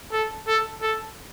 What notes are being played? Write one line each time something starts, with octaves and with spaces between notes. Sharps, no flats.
A4
A4
A4